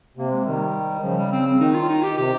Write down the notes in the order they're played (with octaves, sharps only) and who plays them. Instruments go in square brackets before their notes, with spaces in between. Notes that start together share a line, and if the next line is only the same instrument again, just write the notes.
[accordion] C3 [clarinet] A#3
[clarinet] G#3
[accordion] D#3 [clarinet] G3
[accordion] C#3 [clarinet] F3
[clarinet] G3
C4
C4
[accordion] D#3 [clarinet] D#4
[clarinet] F4
D#4
G4
[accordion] C3 [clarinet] G4